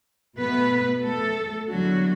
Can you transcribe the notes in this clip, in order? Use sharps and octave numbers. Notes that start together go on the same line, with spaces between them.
B2 A3 B3 B4
A3 A4
E2 D3 F#3 G3 F#4